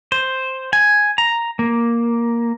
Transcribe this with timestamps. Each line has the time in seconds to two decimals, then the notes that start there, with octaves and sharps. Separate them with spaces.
0.12 C5
0.73 G#5
1.18 A#5
1.59 A#3